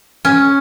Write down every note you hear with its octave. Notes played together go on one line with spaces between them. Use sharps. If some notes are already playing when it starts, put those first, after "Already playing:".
C#4